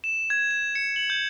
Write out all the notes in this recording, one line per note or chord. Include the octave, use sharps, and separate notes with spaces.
E7
G#6
E7
C#7
F#7
G6